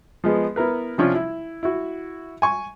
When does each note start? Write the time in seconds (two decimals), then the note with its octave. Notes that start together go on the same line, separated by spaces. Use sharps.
0.24 F3 G#3 B3
0.56 B3 E4 A#4 B4
0.98 C3 F3 C#4 D4 F4
1.15 E4
1.63 E4 F#4
2.42 G#5 C#6